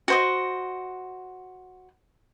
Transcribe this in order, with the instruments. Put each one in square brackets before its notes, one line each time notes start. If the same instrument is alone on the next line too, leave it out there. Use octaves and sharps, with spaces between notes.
[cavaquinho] F#4 C5 D#5